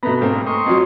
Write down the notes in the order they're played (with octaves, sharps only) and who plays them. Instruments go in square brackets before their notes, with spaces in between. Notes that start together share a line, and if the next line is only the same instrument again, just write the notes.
[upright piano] B2 A3 B3 [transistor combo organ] B4 A#5
[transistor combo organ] G#2 A#3 [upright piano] A3 C4
[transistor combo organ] D#5 C6 C#6
[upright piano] F2 F3 F#3